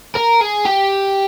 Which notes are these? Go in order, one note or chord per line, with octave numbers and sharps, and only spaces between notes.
A#4
G#4
G4